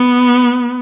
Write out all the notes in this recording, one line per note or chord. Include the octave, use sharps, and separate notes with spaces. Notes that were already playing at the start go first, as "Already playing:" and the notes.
Already playing: B3